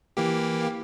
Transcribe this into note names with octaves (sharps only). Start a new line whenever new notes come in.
E3 A#3 G4